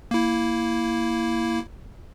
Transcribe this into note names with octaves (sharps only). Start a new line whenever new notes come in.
A#3 E4